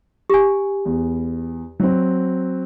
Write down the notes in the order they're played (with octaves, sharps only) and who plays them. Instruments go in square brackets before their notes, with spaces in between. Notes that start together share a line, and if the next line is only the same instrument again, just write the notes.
[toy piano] G4 G#5
[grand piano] E2
F#3 C4